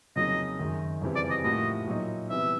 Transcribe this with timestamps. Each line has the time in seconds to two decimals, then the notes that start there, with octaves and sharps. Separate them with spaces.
0.16 F2 C#3 F#3 A#3 D#4 D#5
0.59 F#2 D#3 G#3
1.01 F2 C#3 E3 G3 C4
1.16 D5
1.30 D#5
1.44 A2 F3 A#3 D#4 F#4 D#5
1.88 A#2 F#3 A#3 D#4
2.29 C3 E3 G3 B3 E5